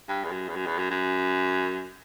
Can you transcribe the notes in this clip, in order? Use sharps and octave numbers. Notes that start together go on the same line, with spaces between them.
G2
E2
F#2
E2
F#2
E2
F#2
F#2